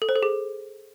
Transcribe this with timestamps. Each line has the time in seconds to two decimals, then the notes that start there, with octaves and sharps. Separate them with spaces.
0.02 A4
0.09 C5
0.16 A4
0.23 G#4